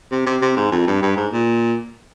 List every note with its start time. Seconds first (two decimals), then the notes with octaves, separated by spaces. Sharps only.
0.11 C3
0.26 C3
0.42 C3
0.57 G#2
0.72 F2
0.87 G2
1.02 G2
1.17 G#2
1.32 A#2